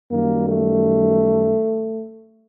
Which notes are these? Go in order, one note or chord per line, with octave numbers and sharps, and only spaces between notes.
F#2 D#3 G3 A#3
A3